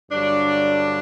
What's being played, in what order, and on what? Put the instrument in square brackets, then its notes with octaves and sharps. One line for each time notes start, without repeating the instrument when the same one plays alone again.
[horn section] G2 D3 F#3 D4